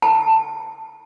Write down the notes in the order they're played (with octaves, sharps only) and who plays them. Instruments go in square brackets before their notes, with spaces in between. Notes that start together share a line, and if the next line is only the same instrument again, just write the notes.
[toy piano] A5